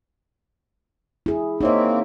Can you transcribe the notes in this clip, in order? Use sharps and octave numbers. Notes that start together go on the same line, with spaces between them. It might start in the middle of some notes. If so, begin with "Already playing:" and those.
E4 G#4
A#3 C4 D#4 C#5 E5